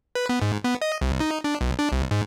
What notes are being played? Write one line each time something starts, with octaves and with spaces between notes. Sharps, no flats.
B4
B3
G#2
B3
D#5
C2
D#4
D4
B1
D4
C2
G#2